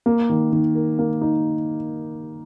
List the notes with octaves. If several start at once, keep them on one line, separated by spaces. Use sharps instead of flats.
A#3
D#3
D#3
A#4
A#3
D#4